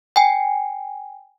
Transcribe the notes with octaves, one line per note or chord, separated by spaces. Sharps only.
G5 G#5